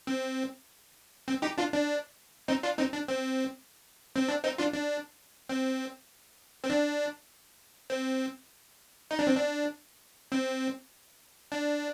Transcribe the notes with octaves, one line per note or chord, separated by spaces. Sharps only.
C4
C4
D#4 G4
D4 F4
D4
C4 D#4
D4 F4
C4 D#4
D4
C4
C4
D4
C4 D#4
D4 F4
D4
C4
C4
D4
C4
D#4
D4
C4
D4
C4
D4